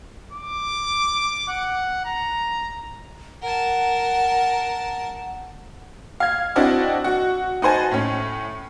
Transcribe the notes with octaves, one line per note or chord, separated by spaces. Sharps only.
D6
F#5
A#5
A#4 F#5 A5
F5 G#6
C4 D4 E4 F#4 D#5
F#4
D#4 F#4 C5 G#5 A5
A2 C#4